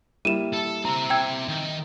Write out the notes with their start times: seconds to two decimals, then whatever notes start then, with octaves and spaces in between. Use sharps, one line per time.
0.25 G3 A#3 E4 D#7 E7
0.53 A4
0.85 C4 E5 A#5
1.10 G5 E6 G#6
1.48 D#3